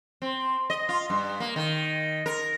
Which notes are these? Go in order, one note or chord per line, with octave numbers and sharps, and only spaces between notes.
C4
D#5
F4
G2
A#3
D#3
A#4